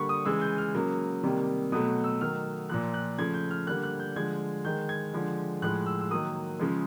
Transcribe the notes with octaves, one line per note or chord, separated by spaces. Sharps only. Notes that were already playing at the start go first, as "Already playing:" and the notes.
Already playing: D3 G3 A#3 B5 C#6
D#6
C#3 E3 G#3 E6
G6
F6
C#3 F#3 A#3
C3 D#3 G3 A#3
B2 F#3 A3 D#6
E6
D#3 F#3 A3 F6
A#2 F3 A#3 F#6
F#6
C#3 F3 A3 G#6
G6
F6
D3 G3 A#3 F#6
F#6
G6
D3 F3 G#3 G#6
D#3 G#3 G6
G#6
D3 F3 G#3
A2 F3 G#3 F#6
E6
E6
D#3 F#3 A#3 D#6
C#3 F3 G#3